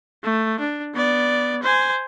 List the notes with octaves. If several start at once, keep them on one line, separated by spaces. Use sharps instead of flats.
A3
D4
B3 D5
C5 G#5